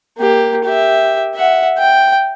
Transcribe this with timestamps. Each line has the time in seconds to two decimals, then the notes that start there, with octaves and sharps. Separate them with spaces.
0.18 A#3 G4
0.65 G4 E5
1.35 E5 F#5
1.78 G5